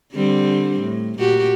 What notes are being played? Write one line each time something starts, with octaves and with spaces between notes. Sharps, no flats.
D3 G3 C4
A2
A#2 F#4 G4